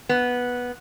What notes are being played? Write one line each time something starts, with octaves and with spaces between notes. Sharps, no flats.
B3